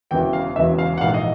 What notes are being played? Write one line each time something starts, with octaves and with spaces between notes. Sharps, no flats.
E1 E2 C#3 E3 G5
F5
E1 E2 C#3 E3 E5
F5
F#5
A#1 G#2 E3 F5
D#5